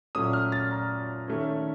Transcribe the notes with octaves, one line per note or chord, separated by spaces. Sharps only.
A#2 F#3 A3 C#4 D#6
F6
A6
A#5
D#3 A3 C#4